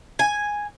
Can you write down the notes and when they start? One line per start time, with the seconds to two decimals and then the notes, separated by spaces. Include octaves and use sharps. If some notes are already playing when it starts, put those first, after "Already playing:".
0.19 G#5